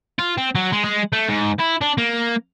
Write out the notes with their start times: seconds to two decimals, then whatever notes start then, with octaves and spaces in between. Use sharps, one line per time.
0.19 F4
0.38 C4
0.55 F#3
0.72 G#3
0.84 G#3
1.13 A3
1.29 G#2
1.59 E4
1.81 D4
1.98 A#3